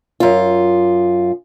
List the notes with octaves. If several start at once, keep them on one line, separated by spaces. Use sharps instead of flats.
F#2 F4